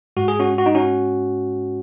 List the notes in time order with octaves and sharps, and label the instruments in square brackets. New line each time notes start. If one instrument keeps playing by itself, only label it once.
[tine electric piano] G#2 G#3 F#4
G#4
C#4 F#4
F#4
D#4
C#4 F#4